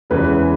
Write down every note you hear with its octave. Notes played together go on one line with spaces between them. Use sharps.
E2 C#3 E3 G#3 B4